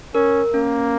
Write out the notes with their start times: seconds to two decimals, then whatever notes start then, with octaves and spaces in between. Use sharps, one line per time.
0.14 C#4 A#4
0.53 A#3 C#4